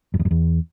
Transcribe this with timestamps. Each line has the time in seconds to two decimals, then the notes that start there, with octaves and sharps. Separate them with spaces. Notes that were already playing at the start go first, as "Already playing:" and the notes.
0.14 F#2
0.19 E2
0.25 F#2
0.31 E2